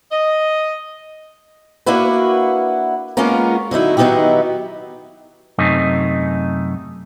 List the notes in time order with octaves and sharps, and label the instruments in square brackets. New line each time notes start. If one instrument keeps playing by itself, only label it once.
[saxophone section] D#5
[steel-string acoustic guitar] A#3 D4 E4 F#4 B4
G#3 A#3 B3 C#4 F4 A#4
D3 F#3 D#4 E4
D#3 F#3 B3 D#4 E4 G4
[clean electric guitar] F#2 C3 A3 D#4